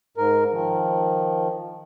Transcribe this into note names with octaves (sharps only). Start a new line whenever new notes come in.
G#2 A#4
D#3 F3